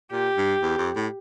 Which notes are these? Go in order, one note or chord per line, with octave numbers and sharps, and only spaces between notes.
A#2 G4
G2
E2
F2
A2